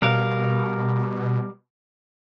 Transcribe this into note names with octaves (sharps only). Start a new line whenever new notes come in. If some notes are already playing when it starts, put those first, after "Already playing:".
B2 G3 A#4 F5